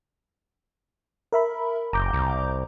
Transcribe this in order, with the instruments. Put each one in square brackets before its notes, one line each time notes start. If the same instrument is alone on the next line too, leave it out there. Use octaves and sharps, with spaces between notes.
[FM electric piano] A#4 E5 B5
[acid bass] F#1 [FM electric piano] A#5 D6 G6
[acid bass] C2